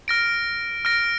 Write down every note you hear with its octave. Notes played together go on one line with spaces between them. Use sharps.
F6 A#6 D7
F6 A#6 D7